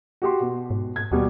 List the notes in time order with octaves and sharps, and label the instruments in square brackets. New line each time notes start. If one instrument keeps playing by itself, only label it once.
[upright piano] F#4 G4 C6
B2
[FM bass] G#2
[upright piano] G#6
[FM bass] D#2 [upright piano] B2 G3